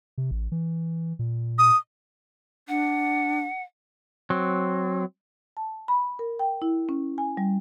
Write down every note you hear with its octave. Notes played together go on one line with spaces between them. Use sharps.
C3
A1
E3
A#2
D#6
D4 F#5
F#3 C4
A5
B5
A#4
G5
E4
C#4
G#5
G3